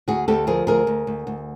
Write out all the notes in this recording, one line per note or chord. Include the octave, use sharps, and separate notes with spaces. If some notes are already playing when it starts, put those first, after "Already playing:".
D2 F#4 G#4
D2 G4 A4
F3 G#4 A#4
D2 G#4 A#4
D2
D2
D2